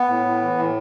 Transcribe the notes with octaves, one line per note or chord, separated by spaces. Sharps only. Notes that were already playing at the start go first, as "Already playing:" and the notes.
Already playing: B3
A2
A2
E3
A2